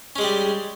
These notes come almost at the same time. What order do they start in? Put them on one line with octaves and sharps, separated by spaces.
C#4 G#3 G#4 G3